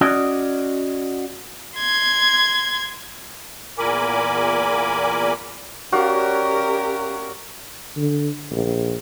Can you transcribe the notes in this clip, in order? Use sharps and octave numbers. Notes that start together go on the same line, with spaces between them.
C#4 F#4 D5 D#5
C6 G#6
E2 A#2 A#4 G#5 B5 D6
C#4 F#4 G4 A#4 C#5 D5 F5
D3
A#1